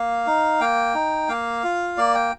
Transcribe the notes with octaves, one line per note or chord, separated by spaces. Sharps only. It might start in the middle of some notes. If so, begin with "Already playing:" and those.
Already playing: A#3 F5
D#4
A#3 G5
D#4
A#3 F5
F4
A#3 D5
G5